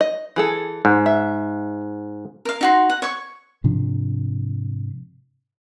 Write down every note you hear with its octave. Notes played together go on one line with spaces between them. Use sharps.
D#5
E3 G#4 A4
G#2
E5
A#4 F5
D#4 F#4 C6
F#5
C#5 C#6
G#2 C3 F3 D4